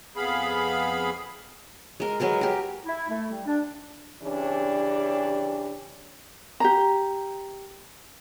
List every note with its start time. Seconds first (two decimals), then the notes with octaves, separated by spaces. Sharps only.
0.16 F2 B3 G#4 F5 B5
2.00 G#3 A#4
2.20 F#3 G#3 A#4 B4
2.41 G4 A#4
2.85 E4
3.09 A3
3.31 G3
3.46 D4
4.22 C#3 E3 C#4 D4 G4
6.60 G4 A#5